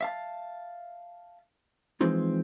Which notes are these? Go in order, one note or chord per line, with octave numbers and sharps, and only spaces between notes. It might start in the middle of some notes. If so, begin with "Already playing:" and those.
E5 F5 A5
E3 F3 G#3 C4 D#4 F4